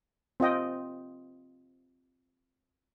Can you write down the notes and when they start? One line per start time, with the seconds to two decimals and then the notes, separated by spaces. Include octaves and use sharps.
0.40 C4 F4 D#5 G5